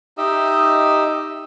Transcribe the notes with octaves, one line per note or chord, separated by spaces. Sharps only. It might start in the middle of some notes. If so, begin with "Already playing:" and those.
D#4 G4 D#5 E5